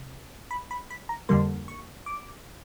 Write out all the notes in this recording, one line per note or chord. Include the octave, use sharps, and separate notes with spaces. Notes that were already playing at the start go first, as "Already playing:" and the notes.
Already playing: C3
B5
B5
B5
A#5
F2 D3 G3 A#3 C6
C#6
D6